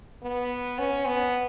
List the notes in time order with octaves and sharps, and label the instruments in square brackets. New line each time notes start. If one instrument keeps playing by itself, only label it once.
[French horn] B3
C#4
B3